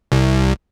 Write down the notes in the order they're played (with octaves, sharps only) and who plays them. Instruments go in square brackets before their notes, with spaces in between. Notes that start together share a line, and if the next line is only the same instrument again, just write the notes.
[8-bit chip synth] C2